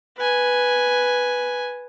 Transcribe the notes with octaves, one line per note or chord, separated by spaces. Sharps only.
B4 G#5